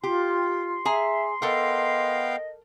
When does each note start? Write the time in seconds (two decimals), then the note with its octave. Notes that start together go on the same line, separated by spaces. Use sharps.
0.03 F4 G4 C6
0.85 G#4 E5 G#5 A#5
1.42 B3 A4 A#4 D#5 F5 G5